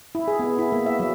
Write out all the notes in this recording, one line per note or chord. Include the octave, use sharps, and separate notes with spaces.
E4
G#4
B3
E4
A#3
E5
F#3